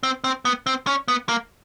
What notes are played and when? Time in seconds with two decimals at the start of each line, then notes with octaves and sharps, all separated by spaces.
0.03 C4
0.24 C4
0.45 B3
0.67 C4
0.87 C#4
1.08 B3
1.29 A#3